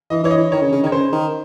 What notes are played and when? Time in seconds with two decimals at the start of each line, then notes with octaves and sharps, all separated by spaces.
0.10 E3 D#5
0.24 E3 C#5
0.31 D#5
0.37 E3
0.52 D#3 C#5
0.62 C#3
0.72 C#3
0.83 D#3 C#5
0.92 C#3 C5
1.12 D#3